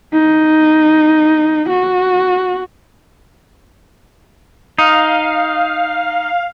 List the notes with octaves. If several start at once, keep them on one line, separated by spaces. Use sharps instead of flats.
D#4
F#4
D#4 F5